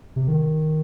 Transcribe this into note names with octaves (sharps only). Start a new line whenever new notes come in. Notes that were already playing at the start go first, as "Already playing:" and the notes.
C3
D#3